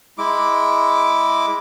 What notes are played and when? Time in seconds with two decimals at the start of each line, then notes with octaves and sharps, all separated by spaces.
0.18 G#3 E4 D6